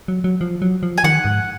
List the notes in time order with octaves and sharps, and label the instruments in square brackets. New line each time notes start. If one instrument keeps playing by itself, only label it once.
[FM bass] F#3
F#3
F3
F#3
F3
[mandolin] G#5
[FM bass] D#3 [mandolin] F#5
[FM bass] G#2